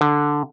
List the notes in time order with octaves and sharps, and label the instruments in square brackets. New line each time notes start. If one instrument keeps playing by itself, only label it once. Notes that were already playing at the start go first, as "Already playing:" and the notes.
[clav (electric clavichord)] D3